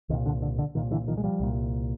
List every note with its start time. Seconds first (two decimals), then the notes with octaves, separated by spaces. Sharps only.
0.09 C2 A#2 D#3
0.26 D3
0.42 D3
0.59 D3
0.75 C2 A#2 D#3
0.91 D3 E3
1.08 D#3 F3
1.17 G#3
1.24 F3 G3
1.40 C2 A#2